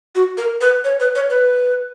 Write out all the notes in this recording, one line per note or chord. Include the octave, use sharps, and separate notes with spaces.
F#4
A#4
B4
C#5
B4
C#5
B4